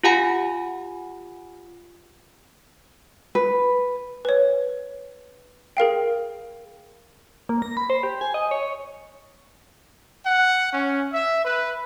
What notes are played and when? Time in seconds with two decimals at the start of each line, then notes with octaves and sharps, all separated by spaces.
0.03 F4 G4 F5 F#5 G#5 B5
3.35 B4
4.25 B4 C#5
5.77 G#4 A#4 F5 G5
7.49 A#3
7.62 A#6
7.77 B5
7.90 C5
8.03 G4
8.21 G#5
8.34 D#5
8.51 C#5
8.63 C#5
10.25 F#5
10.73 C#4
11.13 E5
11.44 B4